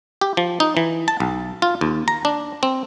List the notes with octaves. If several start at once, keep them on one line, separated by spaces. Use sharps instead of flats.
G4
F3
D#4
E3
A5
B1
F4
D#2
A#5
D4
C4